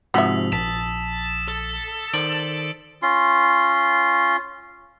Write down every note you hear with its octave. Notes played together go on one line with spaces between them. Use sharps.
G#2 C3 F3 F#4 E5 D#6 E6 B6
A#1 A5 B6
A4
D#3 C5 D5 D7 F#7
C#4 F4 C6